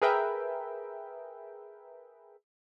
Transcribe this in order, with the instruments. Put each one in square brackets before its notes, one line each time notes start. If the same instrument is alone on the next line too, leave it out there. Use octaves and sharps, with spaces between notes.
[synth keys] G#4 A#4 B4 E5 G5